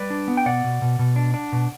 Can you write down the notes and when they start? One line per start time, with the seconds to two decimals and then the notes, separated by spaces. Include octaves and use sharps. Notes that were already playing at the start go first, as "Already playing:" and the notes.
Already playing: G3 B4 D5
0.10 D4
0.28 B3
0.37 G5
0.46 B2 D5 F#5
0.64 B2
0.82 B2
0.99 B2
1.16 D4
1.34 D4
1.52 B2